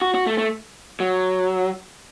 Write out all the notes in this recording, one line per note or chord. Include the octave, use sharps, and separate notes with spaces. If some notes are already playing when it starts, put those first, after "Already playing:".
F#4
F#4
A3
A3
F#3